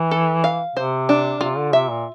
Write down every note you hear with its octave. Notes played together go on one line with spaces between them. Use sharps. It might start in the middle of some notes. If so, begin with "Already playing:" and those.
Already playing: E3
A4
F5
C3 C5
D4
C3 F4
D3
C3 E5
A#2